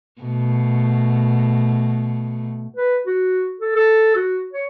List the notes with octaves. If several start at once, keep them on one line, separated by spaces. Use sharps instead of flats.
B2 A3
B4
F#4
A4
A4
F#4
C#5